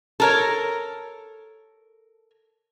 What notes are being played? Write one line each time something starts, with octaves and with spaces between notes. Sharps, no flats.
A4 A#4 C#5